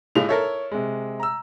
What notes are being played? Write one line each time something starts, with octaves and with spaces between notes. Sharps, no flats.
A2 C#3 G#3 F7
E4 A4 A#4 C#5
C3 G#3
A#5 E6